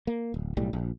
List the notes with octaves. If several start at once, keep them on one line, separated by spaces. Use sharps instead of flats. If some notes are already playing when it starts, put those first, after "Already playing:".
A#3
D1
B1 A2 G3
A#1